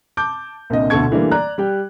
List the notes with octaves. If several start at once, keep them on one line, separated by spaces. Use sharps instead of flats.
A5 D6 G6
C2 A#2 D3 D#5
D2 B2 D3 A4 C#6 G#6
D3 E3 G3 A3 A#3
D5 A#5 F#6
G3 G4 G5